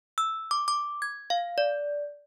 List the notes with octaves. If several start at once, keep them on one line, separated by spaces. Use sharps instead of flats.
E6
D6
D6
G#6
F5
D5